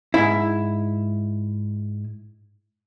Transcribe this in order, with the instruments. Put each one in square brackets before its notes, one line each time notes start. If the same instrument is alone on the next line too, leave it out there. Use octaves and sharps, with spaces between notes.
[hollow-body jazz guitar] G#2 E4